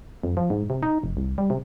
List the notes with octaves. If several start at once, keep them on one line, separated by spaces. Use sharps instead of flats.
F2
F3
G#2
C3
D#4
F1
C2
G3
C3